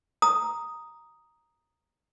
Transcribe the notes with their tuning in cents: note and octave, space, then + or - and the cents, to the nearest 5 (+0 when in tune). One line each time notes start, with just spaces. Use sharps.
A#5 +0 D#6 +0